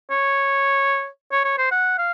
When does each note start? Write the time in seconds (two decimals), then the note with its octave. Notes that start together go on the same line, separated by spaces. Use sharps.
0.11 C#5
1.32 C#5
1.44 C#5
1.58 C5
1.71 F#5
1.98 F5